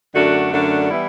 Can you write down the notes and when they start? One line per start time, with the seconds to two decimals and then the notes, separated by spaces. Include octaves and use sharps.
0.14 F#2 D3 A3 D4 F#4
0.51 F#2 D3 A3 D4 F#4
0.89 E3 G3 B3 E4